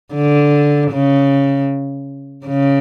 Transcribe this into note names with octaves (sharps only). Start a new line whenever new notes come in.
D3
C#3
C#3